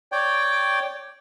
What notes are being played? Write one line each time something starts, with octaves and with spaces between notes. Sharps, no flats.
C#5 D5 G5